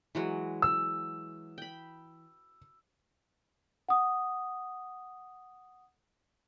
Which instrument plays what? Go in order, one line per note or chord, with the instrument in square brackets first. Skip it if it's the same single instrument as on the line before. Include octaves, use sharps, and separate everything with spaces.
[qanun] E3 F#3 G#3
[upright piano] E6
[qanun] G5 B5
[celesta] F#5 D#6